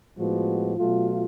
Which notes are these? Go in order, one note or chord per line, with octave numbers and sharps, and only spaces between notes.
A2 F3 G#3 B3 F#4
B2 F#3 A3 F4